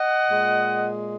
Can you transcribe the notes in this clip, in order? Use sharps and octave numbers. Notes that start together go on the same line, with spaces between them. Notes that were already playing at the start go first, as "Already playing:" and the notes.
Already playing: D#5 F#5
A#2 G#3